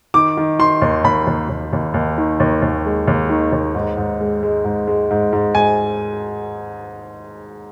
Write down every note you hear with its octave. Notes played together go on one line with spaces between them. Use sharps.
D#3 D6
D#3
D#3 C6
D#2
D#2 B5
D#2
D#2
D#2
D#2
D#3
D#2
D#2
G#3
D#2
D#3
D#2
G#2
G#2
G#3
G#3
G#2
G#3
G#2
G#2
G#2 G#5